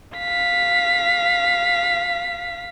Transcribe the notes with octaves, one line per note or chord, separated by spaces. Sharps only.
F5 B6